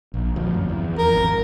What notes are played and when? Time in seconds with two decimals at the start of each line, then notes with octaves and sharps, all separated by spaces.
0.14 A#1
0.36 D2 F3
0.54 F#2
0.69 E2
0.98 F2 A#4
1.13 G#1